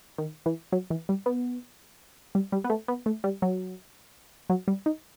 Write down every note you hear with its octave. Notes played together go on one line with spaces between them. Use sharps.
D#3
E3
F#3
E3
G3
B3
G3
G3
B3
A3
B3
A3
G3
F#3
F#3
G3
D#4